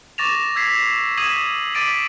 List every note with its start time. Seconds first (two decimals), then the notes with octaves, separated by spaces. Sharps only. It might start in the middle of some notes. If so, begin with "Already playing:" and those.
0.18 C#6 D6 A6 A#6 E7 F7
0.56 E6 G#6 B6 C7
1.17 D#6 G#6 B6 D#7 E7 F#7
1.74 D6 A6 B6 D7 D#7 F#7